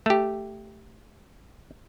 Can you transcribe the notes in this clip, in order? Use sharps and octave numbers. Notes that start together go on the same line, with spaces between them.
A3 G4